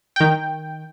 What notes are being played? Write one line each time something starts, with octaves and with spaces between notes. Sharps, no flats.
D#3 G5